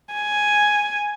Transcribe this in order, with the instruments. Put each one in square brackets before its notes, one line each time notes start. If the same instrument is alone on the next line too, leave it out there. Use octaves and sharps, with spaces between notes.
[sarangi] G#5